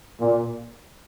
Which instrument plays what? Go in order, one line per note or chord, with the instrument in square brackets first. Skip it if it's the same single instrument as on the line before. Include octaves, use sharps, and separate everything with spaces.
[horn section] A#2